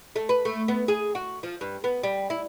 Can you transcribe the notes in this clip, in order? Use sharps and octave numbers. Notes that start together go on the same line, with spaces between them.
A3
B4
A3
B3
G#4
F#4
F3
G2
B3
G3
E4